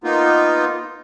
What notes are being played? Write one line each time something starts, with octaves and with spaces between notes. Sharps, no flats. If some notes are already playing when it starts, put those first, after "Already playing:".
A#3 B3 D#4 F4